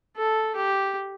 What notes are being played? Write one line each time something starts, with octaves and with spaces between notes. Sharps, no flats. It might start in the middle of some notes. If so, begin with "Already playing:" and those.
A4
G4